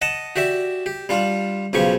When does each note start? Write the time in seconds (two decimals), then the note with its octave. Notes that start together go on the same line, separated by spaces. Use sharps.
0.02 D#5 F#5 A5
0.36 F#4 G4 D5 E5
0.86 G4
1.09 G3 D4 F4
1.73 B1 C#3 F3 G4 C#6